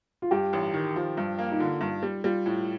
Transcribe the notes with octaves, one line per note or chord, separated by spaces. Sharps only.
F4
G2 G4
A1
D#3
F3 F4
G2
A#3
D#4
D3 F4
G2
G3
G3 F4
A2